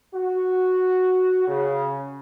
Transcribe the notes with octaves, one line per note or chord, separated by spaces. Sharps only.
F#4
C#3